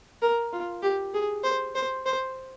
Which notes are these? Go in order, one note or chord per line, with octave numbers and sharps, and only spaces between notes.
A#4
F4
G4
G#4
C5
C5
C5